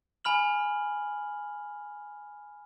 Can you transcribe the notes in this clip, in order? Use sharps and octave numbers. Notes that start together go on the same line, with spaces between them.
G#5 B5 F6 F#7